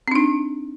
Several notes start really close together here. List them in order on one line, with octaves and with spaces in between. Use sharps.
C4 D4 D#4